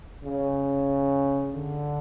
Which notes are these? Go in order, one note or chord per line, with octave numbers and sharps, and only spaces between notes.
C#3
D3